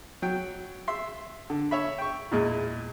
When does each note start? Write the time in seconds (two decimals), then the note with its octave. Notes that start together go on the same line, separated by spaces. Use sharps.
0.22 F#3 G5
0.88 E5 C6
1.50 D3
1.71 C#5 E5 B5
1.98 G5 C#6
2.32 E2 A#2 G#3